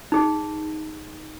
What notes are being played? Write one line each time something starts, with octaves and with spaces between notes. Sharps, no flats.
D#4 G#4